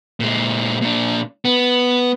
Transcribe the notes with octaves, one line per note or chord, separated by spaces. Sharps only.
A#2 G#3
A#2 D4
B3